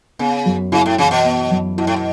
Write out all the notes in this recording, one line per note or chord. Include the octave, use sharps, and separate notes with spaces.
C#3 B3
F#2
C#3 E4
A2
C#3 E3
B2
B3
F#2
B2 E4
A2
B2